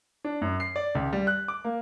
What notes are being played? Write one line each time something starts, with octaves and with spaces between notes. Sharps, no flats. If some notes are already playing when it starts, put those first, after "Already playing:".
D4
F#2
C7
D5
C#2
G3
F#6
D6
A#3